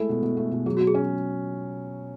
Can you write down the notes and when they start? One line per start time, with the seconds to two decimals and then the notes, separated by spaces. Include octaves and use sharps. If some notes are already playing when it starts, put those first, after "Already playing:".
Already playing: G#3 A3 E4 A4
0.09 B2
0.22 B2
0.37 A3
0.51 B2
0.66 F#3 G#4
0.77 F#4
0.81 F#3
0.87 G#4
0.95 C#4